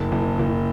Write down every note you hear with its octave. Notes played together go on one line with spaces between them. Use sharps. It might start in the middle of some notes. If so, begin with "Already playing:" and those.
Already playing: F#1
F#1
F#1